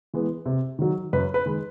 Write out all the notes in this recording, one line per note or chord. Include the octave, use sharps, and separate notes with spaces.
E3 G#3 B3
C3
D#3 F#3
F#2 B4
B4
D#3 G#3